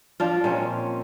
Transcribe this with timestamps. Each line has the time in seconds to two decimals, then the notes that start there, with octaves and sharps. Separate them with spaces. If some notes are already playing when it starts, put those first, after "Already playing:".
0.20 F3 D4 F4
0.44 A#2 G#3 C4 C#4